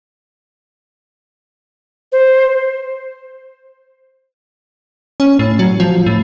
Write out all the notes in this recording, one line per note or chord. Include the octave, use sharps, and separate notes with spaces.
C5
C#4
A2
F#3
F3
A2